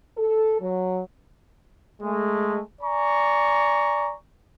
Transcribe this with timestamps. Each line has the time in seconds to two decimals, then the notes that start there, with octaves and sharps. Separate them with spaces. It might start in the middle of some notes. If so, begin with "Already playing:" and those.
0.18 A4
0.60 F#3
2.02 G#3 A3
2.82 D5 G#5 A#5 C#6